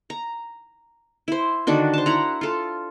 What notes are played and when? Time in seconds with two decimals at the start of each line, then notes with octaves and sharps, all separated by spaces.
0.10 A#5
1.28 E4 C5
1.67 D3 D#3 D4 F#4
1.94 C5 A5
2.06 E4 F#5 A#5
2.41 F4 A4